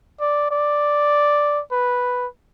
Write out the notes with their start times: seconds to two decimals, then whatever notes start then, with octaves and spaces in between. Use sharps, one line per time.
0.21 D5
0.51 D5
1.72 B4